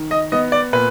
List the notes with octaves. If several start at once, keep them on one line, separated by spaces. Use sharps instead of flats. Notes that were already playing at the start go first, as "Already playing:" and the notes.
Already playing: D#3
D#5
B3 D#5
D5
A#2 B4